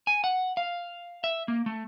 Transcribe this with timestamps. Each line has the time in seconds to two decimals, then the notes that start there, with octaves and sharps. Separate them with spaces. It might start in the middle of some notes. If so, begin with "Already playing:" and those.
0.07 G#5
0.24 F#5
0.57 F5
1.24 E5
1.48 A#3
1.66 A3